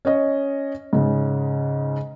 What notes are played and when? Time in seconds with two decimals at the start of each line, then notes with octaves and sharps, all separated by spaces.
0.05 C#4 C#5 D#5
0.93 G#2 C#3